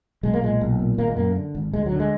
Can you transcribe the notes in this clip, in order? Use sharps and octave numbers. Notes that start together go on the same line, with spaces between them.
B1 G#3
A#3
A#2 G#3
B1
A#2
G#1 A#3
G#3
F#2 A#3
D3
G#1
D2 G#3
F#3
D3
G#3